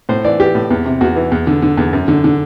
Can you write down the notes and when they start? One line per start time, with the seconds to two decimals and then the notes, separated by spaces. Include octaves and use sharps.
0.09 A2 C5
0.24 E3 D5
0.40 E3 G4
0.55 A2
0.70 E2
0.86 C3
1.01 E2 F#4
1.16 E3
1.32 E2
1.47 D3
1.62 D3
1.77 E2
1.93 F#2
2.08 D3
2.24 D3